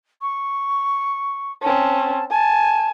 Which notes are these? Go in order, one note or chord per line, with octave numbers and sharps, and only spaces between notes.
C#6
C4 C#4 A5
G#5 A5